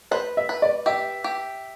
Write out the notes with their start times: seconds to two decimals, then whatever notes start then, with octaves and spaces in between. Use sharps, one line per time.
0.11 B4 C5
0.37 E5
0.49 B4
0.62 D5
0.86 G4 E5
1.24 G4